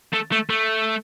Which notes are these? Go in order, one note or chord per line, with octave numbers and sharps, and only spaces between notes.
A3
A3
A3